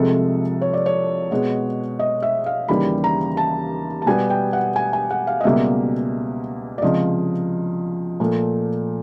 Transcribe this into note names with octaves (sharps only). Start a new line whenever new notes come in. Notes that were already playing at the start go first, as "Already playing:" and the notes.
Already playing: C2 C3 F3 G#3 A4
C#5
D5
C#5
B2 G#3 B3
D#5
E5
F5
D#2 C#3 E3 G3 B5
A#5
A5
A5
B2 G3 B3 G#5
G5
F#5
G#5
G#5
F#5
F5
D#5
C#2 B2 G3 A#3 E5
D5
C#2 C3 F3 D#5
A#2 F3 A3